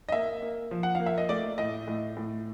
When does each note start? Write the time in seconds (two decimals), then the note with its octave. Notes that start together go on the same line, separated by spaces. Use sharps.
0.09 D#5
0.12 A#3 E5
0.42 A#3
0.71 F3
0.83 F#5
0.95 A#3 F5
1.06 E5
1.18 D#5
1.29 A3 D5
1.58 A2 D#5
1.88 A2
2.17 A2